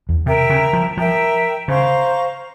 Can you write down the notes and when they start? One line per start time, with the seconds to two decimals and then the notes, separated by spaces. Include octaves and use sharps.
0.09 E2
0.26 C3 A#4 E5 G5 A#5
0.50 C#3
0.73 F3
0.97 F3 A#4 E5 G5 A#5
1.68 C#3 C5 F5 A#5 C#6